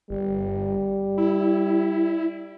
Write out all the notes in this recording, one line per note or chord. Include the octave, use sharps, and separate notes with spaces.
G1 G3
E4